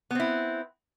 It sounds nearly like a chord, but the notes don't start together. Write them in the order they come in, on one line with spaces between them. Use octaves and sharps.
B3 C4 E4